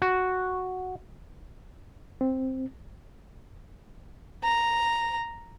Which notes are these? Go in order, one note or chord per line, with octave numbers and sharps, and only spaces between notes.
F#4
C4
A#5